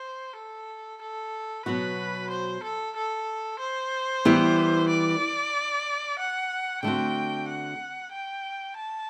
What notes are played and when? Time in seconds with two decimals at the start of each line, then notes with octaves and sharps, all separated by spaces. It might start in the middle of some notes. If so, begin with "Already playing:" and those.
Already playing: C5
0.36 A4
1.02 A4
1.65 B2 F#3 B3 F#4 B4
2.30 C5
2.63 A4
2.96 A4
3.60 C5
4.25 E3 G3 B3 E4 G4
4.89 D5
6.19 F#5
6.83 D3 A3 C4 F#4 G5
7.49 F#5
8.12 G5
8.77 A5